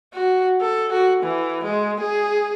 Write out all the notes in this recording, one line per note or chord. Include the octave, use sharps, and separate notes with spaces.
F#4
A4
F#4
E3
G#3
G#4